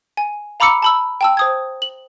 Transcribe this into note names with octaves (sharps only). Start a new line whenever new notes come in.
G#5
F5 A#5 B5 D6 E6 C#7
A5 B5 E6
G5 A5 E6
C5 D#6 G#6
F#7